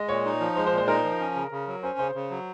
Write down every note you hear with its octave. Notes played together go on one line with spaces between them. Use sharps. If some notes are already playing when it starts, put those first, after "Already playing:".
Already playing: G#3 D#5
A#2 C#5
D#4
F3
G#3 C5
C5
A#2
C5
D#4 A#4
F3
C#4
C#3
C#3
F#3
C#4 C5
C#3 C5
C#3
F#3